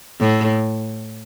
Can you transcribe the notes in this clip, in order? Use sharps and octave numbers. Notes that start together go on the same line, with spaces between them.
A2